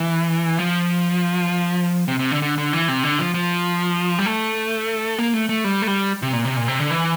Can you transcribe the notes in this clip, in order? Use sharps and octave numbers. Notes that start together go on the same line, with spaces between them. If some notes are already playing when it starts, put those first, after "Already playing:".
Already playing: E3
F3
C3
C3
D3
D3
D3
E3
C3
D3
F3
F3
G3
A3
A#3
A3
A3
G3
A3
G3
C3
A#2
C3
A#2
C3
D3
E3